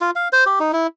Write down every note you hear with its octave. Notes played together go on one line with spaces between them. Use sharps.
F4
F5
C5
G4
D#4
E4